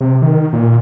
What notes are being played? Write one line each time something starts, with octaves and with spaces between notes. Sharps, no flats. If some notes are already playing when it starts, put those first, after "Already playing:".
C3
D#3
A#2